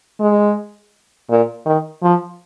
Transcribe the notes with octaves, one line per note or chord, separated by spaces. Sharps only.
G#3
A#2
D#3
F3